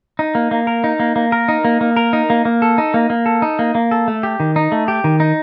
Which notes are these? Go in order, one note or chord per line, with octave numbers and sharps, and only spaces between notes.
D#4
A#3
A#3
A#4
D#4
A#3
A#3
A#4
D#4
A#3
A#3
A#4
D#4
A#3
A#3
A4
D#4
A#3
A#3
A4
D#4
A#3
A#3
A4
A3
G4
D#3
D#4
A3
G4
D#3
D#4